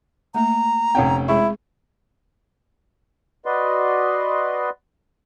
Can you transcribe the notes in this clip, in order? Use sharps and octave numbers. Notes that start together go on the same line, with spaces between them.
A3 A#3 A#5
F1 C4 C#4 F#5 G5
G#3 E4 G#4 C#6
F#4 B4 D5 D#5 C6